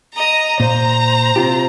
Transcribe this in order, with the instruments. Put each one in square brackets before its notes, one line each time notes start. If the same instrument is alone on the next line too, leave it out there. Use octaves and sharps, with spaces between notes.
[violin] D#5 A#5
[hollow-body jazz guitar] A#2 [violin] C5 A#5
[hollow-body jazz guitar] C3 F4 G4